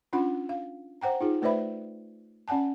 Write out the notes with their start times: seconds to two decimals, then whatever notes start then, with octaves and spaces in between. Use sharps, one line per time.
0.13 C#4 D4 F4 F#5 B5
0.49 F5
1.01 C5 F#5 G5 A#5
1.21 D#4 F4 G#4
1.42 A3 B4 C5 D5 E5 B5
2.48 C#4 D5 F#5 G#5 A5